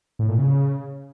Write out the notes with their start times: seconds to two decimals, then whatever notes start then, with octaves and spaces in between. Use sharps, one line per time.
0.19 A2
0.29 A#2
0.38 C#3